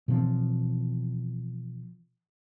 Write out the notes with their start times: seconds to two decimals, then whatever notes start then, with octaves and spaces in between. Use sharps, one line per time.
0.08 B2 E3 F3 C4